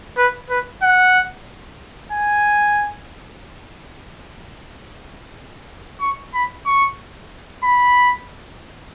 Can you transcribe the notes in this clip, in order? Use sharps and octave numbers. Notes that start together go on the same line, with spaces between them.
B4
B4
F#5
G#5
C#6
B5
C#6
B5